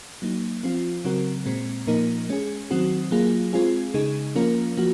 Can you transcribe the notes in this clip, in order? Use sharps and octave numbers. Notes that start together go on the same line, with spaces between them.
F#3 A#3 D#4
F3 C4 F4
C#3 F#3 C4 F#4 A#4
A#2 G#3 C4
A#2 F3 A#3 D#4 A#4
G#3 C#4 G#4
D#3 F#3 C4 F#4
F#3 A#3 F4 G#4
G#3 C4 F4 G#4
C#3 G#3 D#4 G#4
F3 A#3 C#4 F4 A#4
F3 A#3 F#4